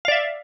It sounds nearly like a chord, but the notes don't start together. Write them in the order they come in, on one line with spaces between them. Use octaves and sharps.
F5 D5 E5